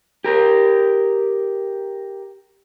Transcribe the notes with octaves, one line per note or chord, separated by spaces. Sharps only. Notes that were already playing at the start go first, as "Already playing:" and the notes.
G4 A#4